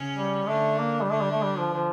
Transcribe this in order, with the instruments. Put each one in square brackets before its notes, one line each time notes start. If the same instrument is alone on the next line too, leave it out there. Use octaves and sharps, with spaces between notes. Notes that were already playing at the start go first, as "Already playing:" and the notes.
Already playing: [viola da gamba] C#3 C#4
[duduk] G3
[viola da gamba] D3 D4 [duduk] A3
[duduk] A#3
G3
[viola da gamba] D3 D4 [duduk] A3
[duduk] G3
A3
G3
F3
F3